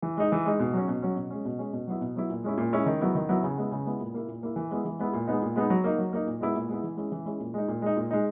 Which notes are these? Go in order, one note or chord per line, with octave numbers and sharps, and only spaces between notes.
E3
G#3 D#4
E3
G#3 D#4
B2
F#3 C#4
B2
F#3 C#4
B2
G#3 C#4
B2
G#3 C#4
B2
F#3 B3 E4
B2
F#3 B3 E4
A#2
G#3 C#4 E4
A#2
G#3 C#4 E4
D#3
F#3 B3 E4
D#3
F#3 B3 E4
C#3
G#3 B3 E4
C#3
G#3 B3 E4
A#2
A#3 E4
A#2
A#3 E4
E3
G#3 B3 E4
E3
G#3 B3 E4
A#2
G#3 B3 D#4
A#2
G#3 B3 D#4
F#3
A#3 D#4
F#3
A#3 D#4
A#2
G#3 B3 E4
A#2
G#3 B3 E4
E3
G#3 C#4 E4
E3
G#3 C#4 E4
A#2
G#3 D#4
A#2
G#3 D#4
A#2
G#3 D#4